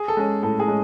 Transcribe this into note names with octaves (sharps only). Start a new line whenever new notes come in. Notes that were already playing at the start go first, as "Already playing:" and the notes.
Already playing: G#4
A4
G#3 C#4
A2 A4
G#4
G#3 C#4